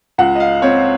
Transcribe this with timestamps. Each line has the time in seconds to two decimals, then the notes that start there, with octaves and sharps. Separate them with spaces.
0.18 C#2 F#5
0.36 D#5
0.40 F5
0.62 C4 C#5